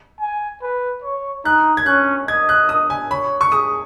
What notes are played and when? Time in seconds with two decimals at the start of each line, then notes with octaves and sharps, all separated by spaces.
0.21 G#5
0.62 B4
1.03 C#5
1.45 D#4 F#6
1.77 G#6
1.86 C#4 F#6
2.28 D#5 G#6
2.49 F#6
2.69 D#6
2.90 G#5
3.11 C#5 B5
3.41 C#6
3.52 G#4 D#6